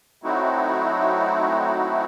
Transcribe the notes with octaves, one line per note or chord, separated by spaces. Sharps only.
F#3 A3 C4 D#4 E4 F#4